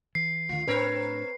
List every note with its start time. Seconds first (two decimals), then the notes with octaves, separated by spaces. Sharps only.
0.15 E3 C7
0.49 D2 D#3 F4
0.68 A2 C4 D4 A#4 B4 C#5